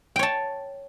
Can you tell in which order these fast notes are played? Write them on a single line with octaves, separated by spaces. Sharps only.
G5 C#5 A5